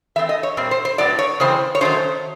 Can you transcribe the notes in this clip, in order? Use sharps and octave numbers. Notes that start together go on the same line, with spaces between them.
E3 A3 C4 E5
D#5
C#5
A#2 G3 C4
C5
C5
A2 F#3 B3 D5
C#5
C#3 E3 G#3 C4 C5
C#5
D#3 F#3 A3 C#4 C5